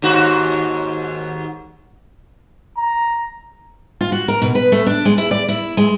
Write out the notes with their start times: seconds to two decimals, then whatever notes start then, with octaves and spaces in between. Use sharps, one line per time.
0.02 D#2 G#2 F#4
2.78 A#5
4.01 F4
4.12 F#4
4.28 A#4
4.42 B2
4.55 B4
4.72 A3
4.87 D4
5.05 G#3
5.18 E4
5.31 D5
5.48 E4
5.77 G#3